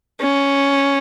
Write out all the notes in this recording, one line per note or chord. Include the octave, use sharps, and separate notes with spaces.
C#4